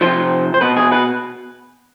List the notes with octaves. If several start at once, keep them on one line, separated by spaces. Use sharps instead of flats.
C3 F3 C5
C5
B2 B4
G#4
B4